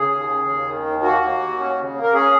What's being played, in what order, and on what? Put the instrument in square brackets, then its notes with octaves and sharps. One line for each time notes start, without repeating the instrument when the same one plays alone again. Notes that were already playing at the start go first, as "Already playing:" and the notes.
Already playing: [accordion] C#3 G#4
D#2
C#3
D#2
D#3
D#2
A#3 F#4
A#3
D#2
C#4
C#3
A#3
A#4
C#4 G#4